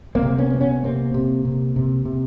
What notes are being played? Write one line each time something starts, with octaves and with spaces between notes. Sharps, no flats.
A#3 C4
C3
B3 C#4
D2
B3 C#4
C3 A#3 C4
C3
C3
C3
C3